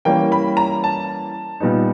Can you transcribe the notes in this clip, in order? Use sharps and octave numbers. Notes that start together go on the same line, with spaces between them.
E3 G3 A#3 C#4 G5
B5
A#5
A5
A#2 G3 B3 D#4